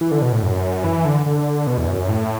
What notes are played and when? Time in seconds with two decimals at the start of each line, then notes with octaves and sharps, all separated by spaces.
0.01 E3
0.11 D3
0.22 B2
0.32 A2
0.43 F#2
0.84 E3
1.05 D3
1.26 D3
1.67 B2
1.78 E2
1.88 F#2
2.09 A2